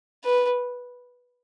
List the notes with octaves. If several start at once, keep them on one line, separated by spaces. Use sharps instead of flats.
B4